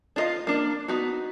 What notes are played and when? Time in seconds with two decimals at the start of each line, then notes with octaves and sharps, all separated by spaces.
0.16 D4 F4 D#5 F5
0.47 A#3 D4
0.88 B3 D#4 F#4